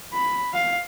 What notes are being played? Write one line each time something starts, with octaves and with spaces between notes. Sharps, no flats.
B5
F5